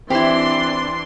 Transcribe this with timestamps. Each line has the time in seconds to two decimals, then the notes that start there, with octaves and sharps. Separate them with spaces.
0.10 E3 C4 D4 E4 G4 C6